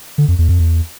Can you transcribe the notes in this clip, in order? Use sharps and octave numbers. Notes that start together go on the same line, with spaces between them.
D3
F2
E2
F2
E2